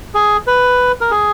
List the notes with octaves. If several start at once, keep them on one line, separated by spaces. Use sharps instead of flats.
G#4
B4
A#4
G#4